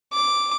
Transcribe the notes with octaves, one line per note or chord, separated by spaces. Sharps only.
D6